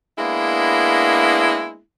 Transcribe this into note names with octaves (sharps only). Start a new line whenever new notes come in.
G#3 A#3 B3 D4 E4